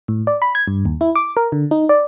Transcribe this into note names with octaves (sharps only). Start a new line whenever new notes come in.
A2
D5
B5
G#6
G2
D#2
E4
D6
A#4
D3
D#4
D5